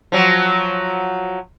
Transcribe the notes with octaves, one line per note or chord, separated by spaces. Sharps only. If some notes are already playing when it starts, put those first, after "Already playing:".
F3 F#3